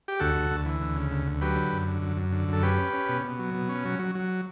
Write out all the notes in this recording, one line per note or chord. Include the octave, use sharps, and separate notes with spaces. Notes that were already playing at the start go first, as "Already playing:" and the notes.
G4
D2 F#4 A4
D2
D2
E3
D2
C#3
D2
D2
F#3 G4 B4
D3
F#2
D3
F#2
F#2
D3
F#2 A4
C#4 G4 B4
C#4
C#4
B2
B2
F#3
B2
C#4
F#3
F#3
F#3